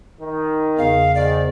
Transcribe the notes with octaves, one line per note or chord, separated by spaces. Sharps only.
D#3
E2 C#3 F5
G#2 D#3 D5